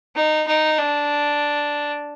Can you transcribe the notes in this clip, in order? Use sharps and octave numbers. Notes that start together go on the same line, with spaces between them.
D#4
D#4
D4